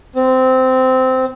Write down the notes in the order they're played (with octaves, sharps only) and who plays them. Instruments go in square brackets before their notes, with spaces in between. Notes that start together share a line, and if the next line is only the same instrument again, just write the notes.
[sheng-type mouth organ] C4